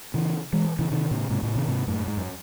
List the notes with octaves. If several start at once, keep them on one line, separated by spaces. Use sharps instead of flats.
C#3 E3
E3 G#3
C#3 E3
C3 D#3
A2 C#3
G#2 C3
A2 C#3
C3 D#3
G#2 C3
F#2 A2
G#2
F#2